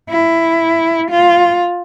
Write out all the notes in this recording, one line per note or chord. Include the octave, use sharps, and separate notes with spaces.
E4
F4